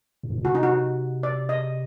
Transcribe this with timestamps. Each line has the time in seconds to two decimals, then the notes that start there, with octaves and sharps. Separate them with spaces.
0.23 G2
0.30 A2
0.38 A#2
0.45 C3 F#4
0.55 D#4
0.63 F#4
1.23 D5
1.49 D#5